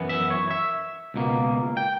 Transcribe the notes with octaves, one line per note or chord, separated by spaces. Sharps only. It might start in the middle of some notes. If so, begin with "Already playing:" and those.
Already playing: F#2 E3 B3
E5
C#5
E5
C#2 B2 A#3
G5